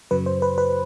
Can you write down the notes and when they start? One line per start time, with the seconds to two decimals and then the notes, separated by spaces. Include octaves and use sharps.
0.11 F#2 C#3 F#3 B4
0.26 C5
0.42 B4
0.58 B4